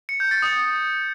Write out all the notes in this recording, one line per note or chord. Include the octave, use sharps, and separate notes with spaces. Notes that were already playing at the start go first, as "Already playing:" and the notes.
C#7
G6
A6
D#6